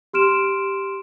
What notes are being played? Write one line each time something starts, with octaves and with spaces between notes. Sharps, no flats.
G4 C6 F6 D7 E7